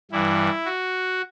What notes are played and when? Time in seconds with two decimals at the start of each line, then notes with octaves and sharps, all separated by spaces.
0.12 G2 E3 G3 E4
0.66 F#4